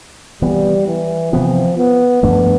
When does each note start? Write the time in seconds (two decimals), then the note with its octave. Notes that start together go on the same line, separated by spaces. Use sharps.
0.42 C3 E3 G3 B3
0.87 E3
1.32 C3 E3 F3 B3
1.78 B3
2.23 G2 F3 A3 B3 D4